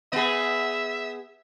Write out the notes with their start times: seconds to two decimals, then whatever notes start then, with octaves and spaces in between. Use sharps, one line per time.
0.13 B3 G#4 E5